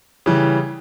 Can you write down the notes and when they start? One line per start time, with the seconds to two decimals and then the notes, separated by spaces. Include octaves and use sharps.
0.26 C#3 E3 G3